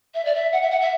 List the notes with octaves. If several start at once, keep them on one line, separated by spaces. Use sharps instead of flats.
E5
D5
E5
F#5
E5
F#5
E5